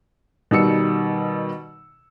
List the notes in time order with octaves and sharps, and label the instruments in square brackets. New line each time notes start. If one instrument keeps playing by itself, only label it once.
[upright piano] B2 D#3 G3 E6 C#7